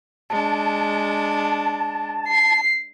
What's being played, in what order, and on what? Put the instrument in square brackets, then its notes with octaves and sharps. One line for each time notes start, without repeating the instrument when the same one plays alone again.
[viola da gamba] G#3 D4 [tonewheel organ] A5
[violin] C7